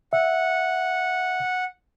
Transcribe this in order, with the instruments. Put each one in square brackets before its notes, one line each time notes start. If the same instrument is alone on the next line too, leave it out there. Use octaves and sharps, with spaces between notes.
[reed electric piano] E5 [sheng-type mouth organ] F#5